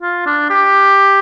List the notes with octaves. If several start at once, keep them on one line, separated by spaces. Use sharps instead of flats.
F4
D4
G4